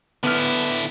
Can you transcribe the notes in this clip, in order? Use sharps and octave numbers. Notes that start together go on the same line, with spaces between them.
D3 B3 E4 F6